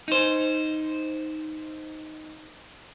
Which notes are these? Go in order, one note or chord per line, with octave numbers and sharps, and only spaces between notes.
D#4 C5